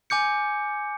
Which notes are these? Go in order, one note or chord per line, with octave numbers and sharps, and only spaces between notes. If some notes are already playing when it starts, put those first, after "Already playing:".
G#5 D6 G6 C#7